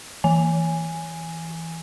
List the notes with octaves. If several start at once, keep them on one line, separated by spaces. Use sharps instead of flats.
E3 G#5